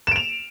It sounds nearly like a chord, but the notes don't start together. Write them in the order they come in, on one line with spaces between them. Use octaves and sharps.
E7 D7 F7